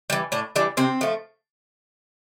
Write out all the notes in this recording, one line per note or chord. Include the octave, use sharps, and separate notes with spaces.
E3 G3
A2 D4
E3 G3 D4
C3 C4
F3 A3